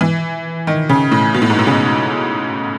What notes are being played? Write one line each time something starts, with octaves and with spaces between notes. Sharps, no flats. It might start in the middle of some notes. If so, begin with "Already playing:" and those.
E3
D#3
C#3
A2
B2
A2
G#2
A2
C#3